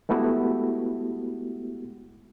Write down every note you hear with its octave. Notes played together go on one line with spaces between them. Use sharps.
G#3 A3 B3 E4 F#4 G4